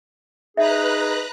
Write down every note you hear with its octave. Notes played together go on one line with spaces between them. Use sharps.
D#4 G#4 B4 E5 A#5 F#6